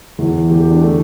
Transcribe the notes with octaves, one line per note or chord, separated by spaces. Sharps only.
E2 E3 E4
E2 E3 G4
G4
D4
D3 A3